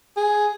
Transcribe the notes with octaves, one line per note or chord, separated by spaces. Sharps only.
G#4